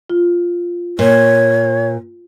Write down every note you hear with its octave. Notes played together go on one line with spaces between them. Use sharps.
F4
A#2 C#5